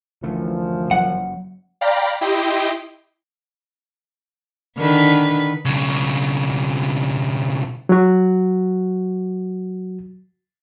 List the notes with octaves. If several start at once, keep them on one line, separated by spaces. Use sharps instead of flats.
F#2 D3 E3 F3 A3
F#3 A#3 C#4 F#5
D5 F5 G5 A#5 B5
E4 G4 D#5 G5 C6
D3 D#3 B4
B1 C#3
F#3 F#4